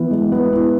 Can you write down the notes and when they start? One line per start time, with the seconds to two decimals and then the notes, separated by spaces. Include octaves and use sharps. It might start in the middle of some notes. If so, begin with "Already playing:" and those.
Already playing: E3 B3 E4
0.11 G#3
0.32 B3
0.53 E4